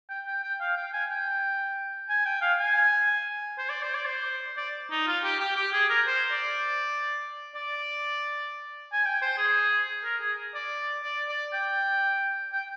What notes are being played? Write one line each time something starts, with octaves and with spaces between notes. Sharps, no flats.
G5
G5
G5
F5
G5
G#5
G5
G#5
G5
F5
G#5
C5
D5
C5
D5
C5
D5
D#4
F4
G4
G4
G4
G#4
A#4
C5
D5
D5
G#5
G5
C5
G#4
A#4
G#4
D5
D5
D5
G5
G5